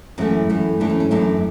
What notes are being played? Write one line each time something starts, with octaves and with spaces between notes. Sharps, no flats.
F#2 E3 A3 C#4
F#2 E3 A3
F#2 E3 A3 D4
C#4
C#4
F#2 E3 A3 D4